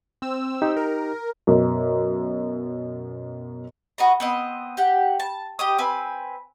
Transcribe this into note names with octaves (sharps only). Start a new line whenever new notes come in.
C4 E6
D#4 G4
A#4
F#2 B2
F#4 D#5 A#5
B3 C4 D#5
G4 F#5
A5
G4 D#5 D#6
C4 B4 G#5